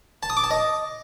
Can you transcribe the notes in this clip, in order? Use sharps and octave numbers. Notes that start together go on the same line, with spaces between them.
A5
D#6
D6
A5
D#5